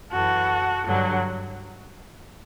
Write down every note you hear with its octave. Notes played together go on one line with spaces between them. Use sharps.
F#2 E3 F#4 A4
G2 D3 F#3